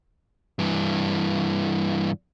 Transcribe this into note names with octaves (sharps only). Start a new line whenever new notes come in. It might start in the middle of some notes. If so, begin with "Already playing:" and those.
G2 E3